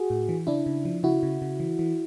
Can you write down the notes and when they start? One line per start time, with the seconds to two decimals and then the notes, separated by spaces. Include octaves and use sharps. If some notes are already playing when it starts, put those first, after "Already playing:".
Already playing: F#4 G#4
0.10 A2
0.29 E3
0.47 C#3 D4 E4
0.66 C#3
0.85 F3
1.03 C#3 E4 F#4
1.23 C#3
1.42 C#3
1.60 E3
1.79 E3